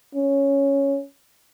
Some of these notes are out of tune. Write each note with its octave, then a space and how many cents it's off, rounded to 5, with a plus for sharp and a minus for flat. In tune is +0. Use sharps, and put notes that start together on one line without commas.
C#4 +0